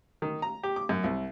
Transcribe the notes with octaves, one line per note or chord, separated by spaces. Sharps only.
D#3
A#5
G4
D6
F#2
C2